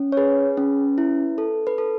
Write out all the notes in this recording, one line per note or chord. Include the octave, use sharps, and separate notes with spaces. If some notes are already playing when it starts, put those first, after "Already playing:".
Already playing: C#4
C#5
G#4 B4
C#4
E4
A4
B4
A4